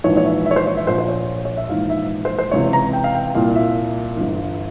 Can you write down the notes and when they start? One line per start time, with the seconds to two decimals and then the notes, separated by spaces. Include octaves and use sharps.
0.04 A#1 G#2 E3 C#5
0.17 C#5
0.26 E5
0.46 E5
0.51 C#5
0.56 C5
0.67 C#5
0.77 E5
0.87 A#1 A#2 C5
0.98 C5
1.08 C#5
1.45 C#5
1.57 E5
1.69 A#1 G#2 E3 F5
1.90 E5
2.25 C5
2.38 C5
2.51 C#2 C3 E3 C#5
2.73 A#5
2.93 G5
3.04 F5
3.15 G5
3.35 C2 A#2 F5
3.56 E5
4.17 G1 G2 E3